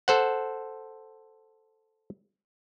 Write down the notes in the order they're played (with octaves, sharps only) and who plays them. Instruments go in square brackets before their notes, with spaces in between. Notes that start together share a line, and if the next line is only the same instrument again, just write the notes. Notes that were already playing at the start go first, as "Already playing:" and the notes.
[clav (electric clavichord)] A4 C5 F#5